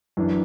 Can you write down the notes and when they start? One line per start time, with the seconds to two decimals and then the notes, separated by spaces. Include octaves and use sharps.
0.17 F#2 E3 D4